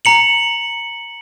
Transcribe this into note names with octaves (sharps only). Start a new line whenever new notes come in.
A#5 C#7 F#7